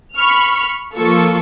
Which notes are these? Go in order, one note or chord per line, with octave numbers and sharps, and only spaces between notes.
B5 C#6 F6
F3 A#3 F4 A4 C#6